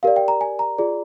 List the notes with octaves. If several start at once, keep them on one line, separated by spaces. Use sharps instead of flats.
G4 A#4 D5 F5
G5
A#5
G#5
A#5
F4 G#4 D5